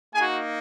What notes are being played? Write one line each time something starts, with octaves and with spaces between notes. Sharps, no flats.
A#3 D#4 F#4 G#4 G#5